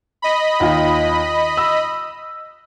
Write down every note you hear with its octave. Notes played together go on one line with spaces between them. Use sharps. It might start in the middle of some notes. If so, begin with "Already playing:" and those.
D#5 B5
D#2 F4
E6